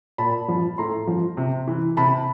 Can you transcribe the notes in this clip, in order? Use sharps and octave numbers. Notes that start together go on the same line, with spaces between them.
A#2 A5 B5
F3
A2 A#5 C6
F3
C3
E3
C3 A5 B5